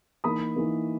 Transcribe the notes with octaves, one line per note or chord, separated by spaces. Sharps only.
E3 A#3 D#4 B5 D#6
E3 A#3 D#4